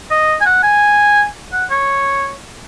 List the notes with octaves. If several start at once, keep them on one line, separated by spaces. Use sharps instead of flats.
D#5
G#5
F#5
G#5
F#5
C#5